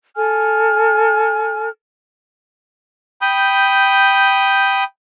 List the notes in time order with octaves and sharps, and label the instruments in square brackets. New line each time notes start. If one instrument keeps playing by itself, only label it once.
[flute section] A4 G#5 F6
[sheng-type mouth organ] G5 B5 D#6 G6